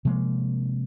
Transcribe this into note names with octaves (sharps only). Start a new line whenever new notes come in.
C3 F3 G#3 A#3